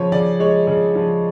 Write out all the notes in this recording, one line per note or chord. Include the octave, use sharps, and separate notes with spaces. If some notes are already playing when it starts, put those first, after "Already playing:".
Already playing: C#3 F3 C#5
C#3 D5
G#3 C#5
C#3
F3